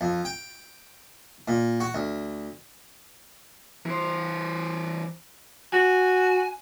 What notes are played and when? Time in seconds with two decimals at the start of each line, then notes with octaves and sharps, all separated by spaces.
0.01 F2
0.25 G5
1.48 A#2
1.80 F#4
1.94 D2
3.86 E3 C5
5.73 F#4 G#5